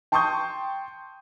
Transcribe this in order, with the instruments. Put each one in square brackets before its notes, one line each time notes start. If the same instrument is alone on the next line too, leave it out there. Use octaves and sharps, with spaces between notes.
[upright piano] G5 A5 C6 C#6 D#6 G6